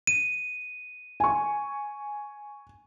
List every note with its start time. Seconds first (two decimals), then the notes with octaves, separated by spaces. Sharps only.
0.07 D#7
1.20 G#5 C#6